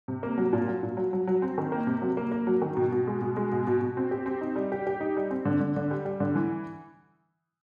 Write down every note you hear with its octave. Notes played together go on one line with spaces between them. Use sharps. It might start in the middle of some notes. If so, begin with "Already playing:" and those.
C3
A#3
F#3
A#2
F#3
A#2
F#3
F#3
F#3
C4
D#3
A#3
C3
F#3
A#3
A#3
F#3
D#3
B2
B2
G#3
B2
G#3
B2
B2
B2
C4
G4
C4
D#4
G3
G4
G4
D#4
G3
C4
D3
D3
D3
G3
G3
D3
E3